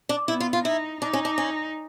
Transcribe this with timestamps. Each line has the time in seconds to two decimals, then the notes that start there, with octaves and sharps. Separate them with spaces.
0.09 D4
0.28 B3 E4
0.40 F4
0.53 F4
0.65 D#4 E4
1.01 D4 D#4
1.13 C#4
1.25 D4
1.38 C#4